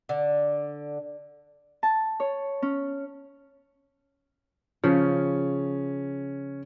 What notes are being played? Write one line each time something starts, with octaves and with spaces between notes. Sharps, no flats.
D3
A5
C#5
C#4
C#3 F3 C#4